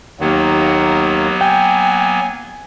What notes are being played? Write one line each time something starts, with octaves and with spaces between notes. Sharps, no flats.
D#2 D#3 F#3 A#3 B3
G5 G#5